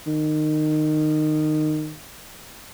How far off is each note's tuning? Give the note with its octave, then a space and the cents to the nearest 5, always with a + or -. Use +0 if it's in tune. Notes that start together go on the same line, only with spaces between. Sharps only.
D#3 -20